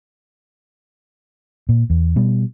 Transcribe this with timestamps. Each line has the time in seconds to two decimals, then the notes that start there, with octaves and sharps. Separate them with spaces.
1.69 A#2
1.90 E2
2.16 B2 G3